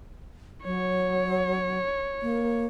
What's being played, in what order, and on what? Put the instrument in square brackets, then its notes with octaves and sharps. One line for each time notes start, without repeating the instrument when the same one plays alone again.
[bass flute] F#3 [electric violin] C#5
[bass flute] A#3